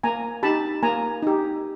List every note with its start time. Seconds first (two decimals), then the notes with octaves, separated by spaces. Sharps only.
0.04 A#3 G#5 A#5
0.43 D#4 G4 A5 B5
0.83 A#3 G#5 A#5
1.22 D#4 G4